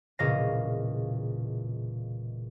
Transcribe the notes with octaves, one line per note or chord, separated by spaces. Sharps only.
E1 A#2 C#3 D#5 F5 A#6